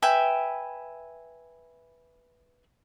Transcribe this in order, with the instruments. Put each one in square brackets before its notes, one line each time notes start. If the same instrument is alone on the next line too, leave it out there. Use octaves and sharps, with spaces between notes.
[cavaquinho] B4 E5 G5 G#5